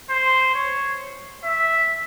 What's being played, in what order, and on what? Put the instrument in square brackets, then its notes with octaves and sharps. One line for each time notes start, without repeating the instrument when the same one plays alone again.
[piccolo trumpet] C5
C#5
E5